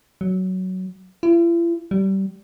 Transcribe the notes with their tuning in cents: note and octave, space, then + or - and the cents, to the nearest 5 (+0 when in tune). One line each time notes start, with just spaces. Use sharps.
F#3 +10
E4 +45
G3 -25